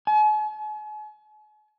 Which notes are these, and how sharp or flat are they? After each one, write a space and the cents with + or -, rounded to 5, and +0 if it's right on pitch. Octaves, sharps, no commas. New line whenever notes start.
G#5 +45